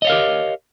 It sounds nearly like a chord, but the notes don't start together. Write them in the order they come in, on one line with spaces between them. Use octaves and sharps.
D#5 C#5 F5 A#4 G4